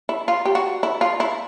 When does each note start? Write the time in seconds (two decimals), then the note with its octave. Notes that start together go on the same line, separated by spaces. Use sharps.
0.09 E4
0.28 F4
0.45 G4
0.55 F#4
0.83 E4
1.01 F4
1.20 E4